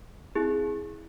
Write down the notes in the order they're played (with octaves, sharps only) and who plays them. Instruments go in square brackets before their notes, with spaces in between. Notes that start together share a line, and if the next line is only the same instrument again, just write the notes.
[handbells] C4 E4 G#4